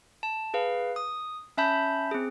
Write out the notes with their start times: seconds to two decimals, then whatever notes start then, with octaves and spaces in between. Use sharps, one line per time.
0.23 A5
0.54 G#4 B4 F5
0.96 D#6
1.57 C#4 E5 A5 B5 G6
2.11 C4 G#4